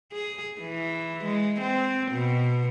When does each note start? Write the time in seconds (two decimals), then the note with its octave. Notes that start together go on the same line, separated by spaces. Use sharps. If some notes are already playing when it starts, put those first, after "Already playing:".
0.13 G#4
0.61 E3
1.25 G#3
1.61 C4
2.12 B2